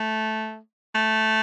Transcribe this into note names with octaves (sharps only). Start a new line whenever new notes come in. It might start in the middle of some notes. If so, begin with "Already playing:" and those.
Already playing: A3
A3